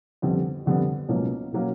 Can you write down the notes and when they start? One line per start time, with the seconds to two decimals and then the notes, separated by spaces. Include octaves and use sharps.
0.22 F2 D3 G3 B3
0.66 F2 D3 G3 B3
1.09 C#2 B2 F#3 A#3 C#4
1.52 B2 F#3 A#3 C#4